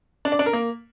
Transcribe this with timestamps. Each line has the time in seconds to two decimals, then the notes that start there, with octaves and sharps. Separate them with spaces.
0.25 D4
0.32 D5
0.39 D4
0.46 A#4
0.53 A#3